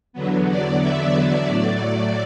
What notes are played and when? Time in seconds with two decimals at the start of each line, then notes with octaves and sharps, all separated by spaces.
0.13 E2 D3 F#3 B3
0.48 D5
0.80 E5
1.13 E5
1.47 A2 F#3 A3 D5